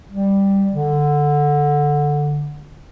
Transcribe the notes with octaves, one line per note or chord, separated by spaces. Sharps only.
G3
D3